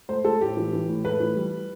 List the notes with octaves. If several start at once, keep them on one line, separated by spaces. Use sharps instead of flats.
A3 C5
A3 A4
A2 G4
E3
E3
A2
A3 B4
E3
G3